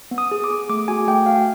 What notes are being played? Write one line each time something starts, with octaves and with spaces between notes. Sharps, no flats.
B3
D#6
G#4
D6
G#4
A3 D6
F#4 G#5
A3 G5
F#4 F5